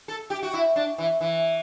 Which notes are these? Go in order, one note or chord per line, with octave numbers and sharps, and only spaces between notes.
A4
G4
F#4
E4
D4
E3
E3